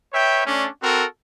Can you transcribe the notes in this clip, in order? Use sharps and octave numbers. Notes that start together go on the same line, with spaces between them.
B4 C#5 E5 G5
A3 C#4 D4
C4 F#4 A4 A#4